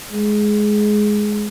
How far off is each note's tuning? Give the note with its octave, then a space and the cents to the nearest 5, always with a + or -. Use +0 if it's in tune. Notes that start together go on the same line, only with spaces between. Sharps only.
G#3 +10